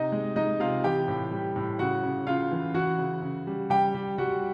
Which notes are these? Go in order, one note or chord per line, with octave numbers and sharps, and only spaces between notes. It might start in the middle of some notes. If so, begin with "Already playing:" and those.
Already playing: C3 D#4 D#5
G#3
G#3 D#4 D#5
C3 F4 F5
E3 G4 G5
A2
G3
A2
C#3 F#4 F#5
C#3
C#3 F4 F5
E3
E3 F#4 F#5
C#3
C#3
G3
G3 G4 G5
G3
G3 F#4 F#5